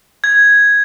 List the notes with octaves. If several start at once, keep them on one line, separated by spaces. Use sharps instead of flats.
G#6